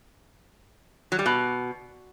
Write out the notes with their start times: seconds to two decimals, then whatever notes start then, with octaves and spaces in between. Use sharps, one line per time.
1.12 F#3
1.19 G3
1.26 B2